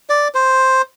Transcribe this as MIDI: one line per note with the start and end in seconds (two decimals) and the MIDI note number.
0.10 0.28 74
0.35 0.82 72